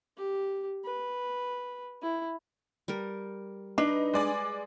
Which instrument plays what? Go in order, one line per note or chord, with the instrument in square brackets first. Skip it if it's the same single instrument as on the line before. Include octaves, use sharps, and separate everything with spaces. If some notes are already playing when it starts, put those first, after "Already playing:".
[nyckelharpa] G4
B4
E4
[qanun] G3 A#4
[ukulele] D4 [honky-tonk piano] D#4 [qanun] B4
[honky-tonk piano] G#3 D5 G#5